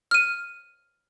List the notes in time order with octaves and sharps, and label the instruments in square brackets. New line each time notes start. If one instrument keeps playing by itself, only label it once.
[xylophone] F6 D#7